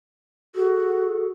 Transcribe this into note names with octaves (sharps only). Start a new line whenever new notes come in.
F#4 G#4 A4